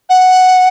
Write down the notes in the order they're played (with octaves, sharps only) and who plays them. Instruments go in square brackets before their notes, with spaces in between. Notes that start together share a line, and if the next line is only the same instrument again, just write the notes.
[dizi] F#5